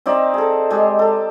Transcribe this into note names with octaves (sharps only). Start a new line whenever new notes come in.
C4 D#4 D5 E5
G#4 A4
G#3 G4
A4